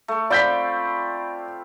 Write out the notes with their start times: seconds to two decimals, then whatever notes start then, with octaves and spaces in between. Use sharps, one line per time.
0.08 A3
0.30 C4 F4 D5 B5 G6 B6